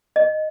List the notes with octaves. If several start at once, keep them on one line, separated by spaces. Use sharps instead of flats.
D#5